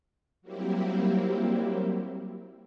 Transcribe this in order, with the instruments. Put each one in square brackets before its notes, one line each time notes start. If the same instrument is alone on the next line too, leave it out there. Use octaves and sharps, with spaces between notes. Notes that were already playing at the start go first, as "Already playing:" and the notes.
[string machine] F#3 G3 A#3 C4 E4 G4